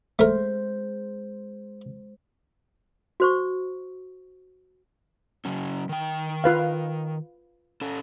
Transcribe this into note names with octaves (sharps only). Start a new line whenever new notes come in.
G#3 A3 A#4 C5
F#4 C5 C#6
C#3 F#3 C#4
D#3 G5
F4 B4 F5
C#4 A4